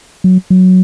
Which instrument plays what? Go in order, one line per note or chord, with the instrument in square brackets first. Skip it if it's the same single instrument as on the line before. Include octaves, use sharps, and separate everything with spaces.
[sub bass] F#3
F#3